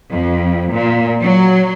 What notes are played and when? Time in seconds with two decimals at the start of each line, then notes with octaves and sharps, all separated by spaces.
0.11 F2
0.73 A#2
1.22 F#3